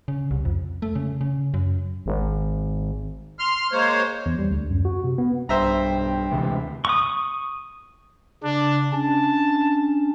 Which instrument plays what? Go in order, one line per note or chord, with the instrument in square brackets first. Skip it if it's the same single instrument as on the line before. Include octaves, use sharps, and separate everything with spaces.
[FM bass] C#3
C2
F2
A3
C#3
C#3
F#2
G#1
[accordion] C6 F6
G#3 A#3 C5 C#5
[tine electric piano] E2
G3
D2
F#2
F#4
C3
B3
[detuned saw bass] B1 [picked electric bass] G2 [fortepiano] C5 E5 A#5 [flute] G5
[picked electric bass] D2 C3 G#3 [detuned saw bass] E3
[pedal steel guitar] C#6 D#6
[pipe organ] C#3 [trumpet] D4
[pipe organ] C#4 D4 [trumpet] A5